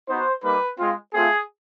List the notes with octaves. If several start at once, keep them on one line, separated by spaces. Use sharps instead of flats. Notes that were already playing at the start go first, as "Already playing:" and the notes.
B3 D#4 F#4 C5
G3 A#3 D#4 B4
G#3 C4 F4
A3 C4 F4 G#4